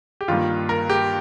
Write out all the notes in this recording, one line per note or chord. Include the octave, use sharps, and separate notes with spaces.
G4
G2 D#3 G3 A#3 F4
A#4
G4